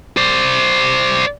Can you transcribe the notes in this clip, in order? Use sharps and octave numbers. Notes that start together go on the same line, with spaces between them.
C5 D5